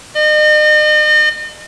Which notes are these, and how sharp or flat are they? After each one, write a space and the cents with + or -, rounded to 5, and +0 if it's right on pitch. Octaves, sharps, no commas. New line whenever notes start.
D#5 -40